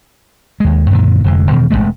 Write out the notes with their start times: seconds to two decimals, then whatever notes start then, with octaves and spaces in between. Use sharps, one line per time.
0.60 D#2 G#3
0.90 F#2 A#2 D3 D#3
1.24 F1 F2 D3 G#3
1.51 E2 B2 D#3
1.70 E1 E2 G#3 A3